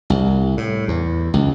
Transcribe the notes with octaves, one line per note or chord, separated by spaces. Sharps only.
C2
A2
E2
C#2